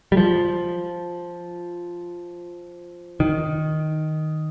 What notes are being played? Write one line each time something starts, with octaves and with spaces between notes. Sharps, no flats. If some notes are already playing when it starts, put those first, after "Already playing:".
G3
F3
D#3